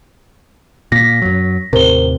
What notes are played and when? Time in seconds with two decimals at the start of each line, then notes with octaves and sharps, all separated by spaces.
0.92 A#2 A#3 A#6 B6
1.22 F#2 F#3
1.73 D#2 A2 C3 A#4 C5 G7